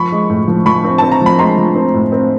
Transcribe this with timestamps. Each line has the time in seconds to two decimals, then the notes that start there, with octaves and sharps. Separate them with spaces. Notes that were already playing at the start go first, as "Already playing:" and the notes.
Already playing: F3 B5 C#6
0.12 G#3
0.30 A2
0.48 F3
0.66 F3 B5 C#6
0.84 C4
0.98 C4 A5
1.11 A#5
1.21 F3 B5
1.39 G#3 A#5 C6
1.58 F3
1.76 C4
1.94 A2
2.12 C4